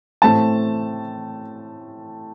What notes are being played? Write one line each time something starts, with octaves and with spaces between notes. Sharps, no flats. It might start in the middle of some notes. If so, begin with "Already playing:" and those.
A2 A3 C4 A5